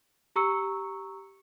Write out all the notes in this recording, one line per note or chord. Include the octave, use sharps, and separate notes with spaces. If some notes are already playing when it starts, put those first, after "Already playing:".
G4 A#5 C#6 E6 C#7